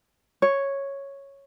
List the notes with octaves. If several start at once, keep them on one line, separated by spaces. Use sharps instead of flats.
C#5